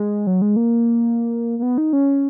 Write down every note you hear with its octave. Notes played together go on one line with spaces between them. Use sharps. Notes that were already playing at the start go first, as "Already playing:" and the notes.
Already playing: G#3
F#3
G#3
A#3
A#3
B3
D#4
C#4